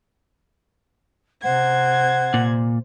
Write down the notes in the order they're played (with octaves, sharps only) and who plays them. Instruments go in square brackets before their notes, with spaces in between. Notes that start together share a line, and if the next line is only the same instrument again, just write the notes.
[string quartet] C3 C5 G#6 [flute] F#5
[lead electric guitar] A#2